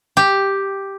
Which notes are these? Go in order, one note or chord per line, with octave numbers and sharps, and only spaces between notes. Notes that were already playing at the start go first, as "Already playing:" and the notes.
G4